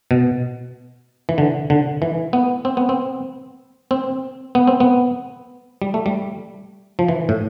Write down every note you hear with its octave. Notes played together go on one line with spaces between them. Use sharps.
B2
E3
D3
D3
E3
B3
C4
B3
C4
C4
B3
C4
B3
G3
A3
G3
F3
E3
A2